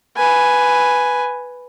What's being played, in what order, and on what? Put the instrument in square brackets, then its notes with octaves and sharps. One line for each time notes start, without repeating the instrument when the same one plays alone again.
[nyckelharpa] B4 G#5